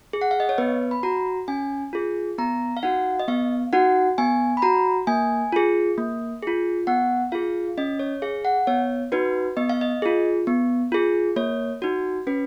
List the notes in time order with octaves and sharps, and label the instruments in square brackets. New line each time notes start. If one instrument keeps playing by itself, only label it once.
[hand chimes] G#4
F#5
F5
D#5
C#5
B3 B4
B5
F#4 A#5
C#4 G#5
F4 G#4
B3 A#5
F5
D#4 F#4 F#5
D#5
B3 F5
D#4 F#4 F#5
B3 G#5
B5
F#4 A#5
A#3 G#5
F4 G#4
A#3
F4 G#4
B3 F#5
F4 G#4 F5
C#4 D#5
C#5
G#4 F5
F#5
B3 C#5
D#4 F#4 B4
B3 D#5
F5
D#5
F4 G#4
B3
F4 G#4
A#3 C#5
D#4 F#4
C#4 B4